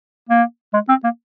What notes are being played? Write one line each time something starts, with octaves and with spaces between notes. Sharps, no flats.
A#3
G#3
C4
A#3